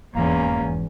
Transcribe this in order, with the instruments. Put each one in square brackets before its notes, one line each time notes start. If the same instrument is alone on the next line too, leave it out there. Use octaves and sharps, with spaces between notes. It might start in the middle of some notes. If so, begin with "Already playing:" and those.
[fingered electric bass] F1 G#2 E3 [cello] E2 C#4 [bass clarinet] A#3